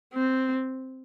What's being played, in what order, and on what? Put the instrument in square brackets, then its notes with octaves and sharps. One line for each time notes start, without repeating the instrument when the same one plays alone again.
[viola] C4